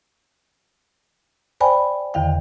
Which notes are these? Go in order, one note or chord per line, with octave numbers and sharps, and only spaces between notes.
C5 D5 G5 G#5 B5
E2 D3 D#3 F5 G5